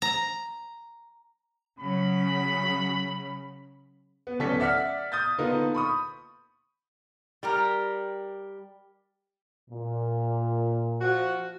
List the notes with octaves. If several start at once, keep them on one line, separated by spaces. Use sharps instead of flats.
A#5
C#3 F#3 B5
B3
D1 B3 C#4 A4 D5 B6
D5 E5 F#5 F6 B6
D#6 G6 A6
D3 A#3 B3 D#4 F4
B5 C#6 D#6
G3 G4 A#4
A#2
F3 F#4